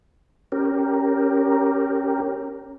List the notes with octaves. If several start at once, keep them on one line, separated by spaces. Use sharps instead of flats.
C#4 G4 A#4